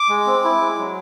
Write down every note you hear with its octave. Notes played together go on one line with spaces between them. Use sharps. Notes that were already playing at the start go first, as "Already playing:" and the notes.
Already playing: D6
G#3
C4
E4
G#3
F#3